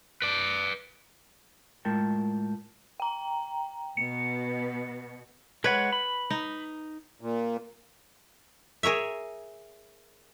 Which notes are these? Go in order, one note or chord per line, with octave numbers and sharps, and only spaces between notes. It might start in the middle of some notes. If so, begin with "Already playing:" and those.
B4 D5
A2 G#3 F4 A#4 G5 A5
G5 A#5
B2 C#7
G#3 B4 C#5 F#5
B5
D#4
A#2
G#4 A#4 C#5 E5